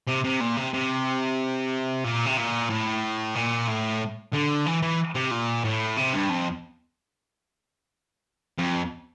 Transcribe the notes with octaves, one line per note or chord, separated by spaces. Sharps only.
C3
C3
A#2
C3
C3
A#2
C3
A#2
A2
A#2
A2
D3
E3
E3
C3
A#2
A2
C3
G2
F2
F2